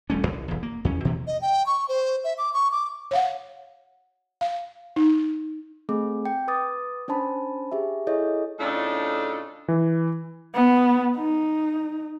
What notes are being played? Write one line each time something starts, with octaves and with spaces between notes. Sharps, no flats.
D#1 G3 A3 C#4
C2
D#1 E2
A#3
E2 C#4
B2 E3 F#3 A#3
D#5
G5
C#6
C5
E5
D6
C#6
D6
C#5 F5 F#5
F5
D#4
A3 C4 G#4 D6
G5
B4 D6 D#6 A6
C#4 D4 C5 A5 B5
G4 G#4 E5
E4 G#4 A4 C#5 D#5
A2 C#3 D4 D#4 F4 A4
E3
B3
D#4